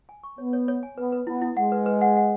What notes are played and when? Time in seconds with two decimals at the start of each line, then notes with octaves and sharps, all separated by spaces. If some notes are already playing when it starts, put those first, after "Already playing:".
0.09 G#5
0.23 C#6
0.38 B3 C#5
0.53 C#5
0.68 C#5
0.83 G#5
0.98 B3 B4
1.12 B4
1.27 B3 E4
1.42 E4
1.56 G#3 F#5
1.72 B4
1.86 B4
2.01 F#5
2.17 F#5